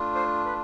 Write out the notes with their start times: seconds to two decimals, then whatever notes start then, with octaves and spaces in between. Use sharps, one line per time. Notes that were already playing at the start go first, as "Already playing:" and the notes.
Already playing: A3 D4 F4
0.15 C5
0.45 B4